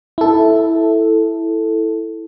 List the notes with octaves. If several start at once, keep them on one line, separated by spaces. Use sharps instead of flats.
E4 A4